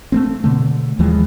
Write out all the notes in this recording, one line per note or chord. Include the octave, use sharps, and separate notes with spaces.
A3 A#3 C4
B2 D3 A3
D#2 E3 F3 G#3